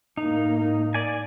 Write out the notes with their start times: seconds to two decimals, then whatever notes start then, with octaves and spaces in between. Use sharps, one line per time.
0.17 A2 A#3 D#4
0.94 D5 G#5